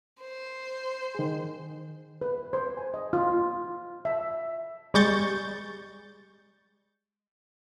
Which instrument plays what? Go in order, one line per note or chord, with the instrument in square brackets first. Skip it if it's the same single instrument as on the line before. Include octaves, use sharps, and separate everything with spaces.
[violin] C5
[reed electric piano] D#3 G#4
[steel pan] B4
C5
G#5
D#5
F4
E5
[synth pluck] G3 G#3 C#6 G6 A6